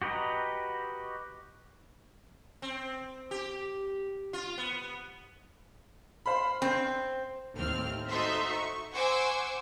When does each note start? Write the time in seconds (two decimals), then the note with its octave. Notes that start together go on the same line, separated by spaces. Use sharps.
0.02 F#4 G4 B4 D#5 A#5
2.62 C4
3.31 G4
4.33 F4
4.58 B3
6.26 C5 F5 B5
6.62 C4
7.56 D#2 A2 C4 F6
8.09 D#4 F#4 A4 C5 E5 C6
8.49 C#6
8.92 C5 F#5 G#5 C#6 D6 E6